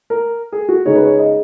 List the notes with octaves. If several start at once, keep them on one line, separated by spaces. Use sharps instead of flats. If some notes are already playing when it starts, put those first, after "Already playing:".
A#4
G#4
F#4
C#3 G#3 D#4 C#5
B4
C#5
D#5